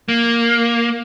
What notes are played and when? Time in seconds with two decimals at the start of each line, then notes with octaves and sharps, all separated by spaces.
0.09 A#3